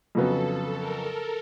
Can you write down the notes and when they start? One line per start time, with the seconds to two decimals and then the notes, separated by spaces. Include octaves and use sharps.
0.15 F2 C#3 F#3 B3 A4
0.78 A#4